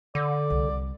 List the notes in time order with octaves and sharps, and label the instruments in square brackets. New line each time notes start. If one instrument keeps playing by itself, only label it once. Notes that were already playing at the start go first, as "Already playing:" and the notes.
[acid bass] D3 [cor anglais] D5
[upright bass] C2